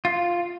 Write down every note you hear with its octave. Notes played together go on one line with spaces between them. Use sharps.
F4